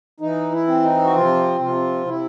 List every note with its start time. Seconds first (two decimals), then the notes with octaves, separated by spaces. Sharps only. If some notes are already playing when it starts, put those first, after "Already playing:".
0.20 E3 D#4
0.52 E4
0.67 C4
0.83 D#4
1.04 F#4
1.14 C3 F3 F4
1.60 C3 F3 F4
2.07 C3 E4